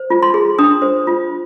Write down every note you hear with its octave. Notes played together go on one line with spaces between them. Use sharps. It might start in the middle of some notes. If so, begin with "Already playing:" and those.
Already playing: C5
F4
C6
G#4
D4 D#6
C5
F4